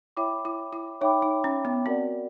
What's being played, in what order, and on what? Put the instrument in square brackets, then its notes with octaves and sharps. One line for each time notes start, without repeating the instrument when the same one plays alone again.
[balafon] E4 [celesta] C#5 E5 G5 B5 D6
[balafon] E4
E4
[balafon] D#4 [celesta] C#5 E5 G5 B5 D6
[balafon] D#4
C#4
B3
[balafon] C4 [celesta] F#4 A#4 D5 F#5